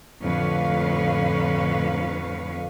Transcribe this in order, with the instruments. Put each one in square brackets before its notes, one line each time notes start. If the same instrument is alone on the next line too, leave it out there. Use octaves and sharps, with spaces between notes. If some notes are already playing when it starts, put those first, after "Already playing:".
[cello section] F2 A2 D3 B4 C#5 F5